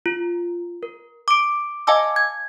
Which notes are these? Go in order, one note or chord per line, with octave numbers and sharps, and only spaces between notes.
F4
A#4
D6 D7
D#5 F5 G#5 A5 D6 E6
G#6